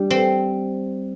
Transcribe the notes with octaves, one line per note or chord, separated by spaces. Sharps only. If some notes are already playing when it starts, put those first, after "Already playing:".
Already playing: G3 D4
C4